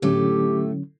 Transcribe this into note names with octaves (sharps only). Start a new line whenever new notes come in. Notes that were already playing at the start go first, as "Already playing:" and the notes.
A2 D3 F#3 A3 C#4 G4